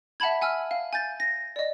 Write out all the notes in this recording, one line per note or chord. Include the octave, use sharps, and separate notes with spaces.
E5 F#5 A5 B5 G#6
F#5 G#5 E6 F6
F5
G#5 G6 A6
A#6
D5 D#5